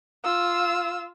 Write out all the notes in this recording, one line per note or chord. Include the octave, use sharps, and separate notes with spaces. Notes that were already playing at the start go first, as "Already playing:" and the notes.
F4 E6